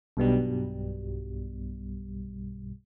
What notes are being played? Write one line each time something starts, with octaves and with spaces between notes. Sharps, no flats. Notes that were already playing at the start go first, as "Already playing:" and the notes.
B1 G2 B2 G3